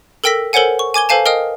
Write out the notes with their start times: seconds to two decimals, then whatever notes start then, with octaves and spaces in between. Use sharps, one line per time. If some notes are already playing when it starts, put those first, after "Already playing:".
0.24 A4 A#4 G5 E6 A#6 B6
0.53 A4 A#4 C5 C#5 F#5 G#5
0.79 C#6
0.94 G#5 D6 G#6 G7
1.09 A4 B4 C5 F5 G#5 A5
1.26 A#4 D#5 F5 G5 D#6 F6